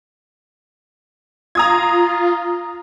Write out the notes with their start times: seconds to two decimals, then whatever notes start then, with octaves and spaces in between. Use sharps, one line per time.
1.55 F4 A#5 D#6 G#6